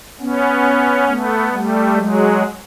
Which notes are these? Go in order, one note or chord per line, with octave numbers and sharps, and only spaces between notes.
B3 C#4
A3 B3
G3 A3
F#3 G#3